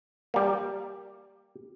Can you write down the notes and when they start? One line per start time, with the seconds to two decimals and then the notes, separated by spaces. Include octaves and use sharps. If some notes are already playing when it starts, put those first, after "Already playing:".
0.34 G3 A#3